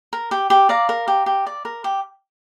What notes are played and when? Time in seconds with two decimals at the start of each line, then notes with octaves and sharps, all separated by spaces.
0.13 A#4
0.31 G4 G5
0.50 G4
0.69 D5 F5 A#5
0.89 A#4
1.08 G4
1.26 G4
1.46 D5
1.65 A#4
1.84 G4